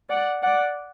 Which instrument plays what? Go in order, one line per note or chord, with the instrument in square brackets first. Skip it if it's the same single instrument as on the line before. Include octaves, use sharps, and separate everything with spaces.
[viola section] D5 F#5
D5 F#5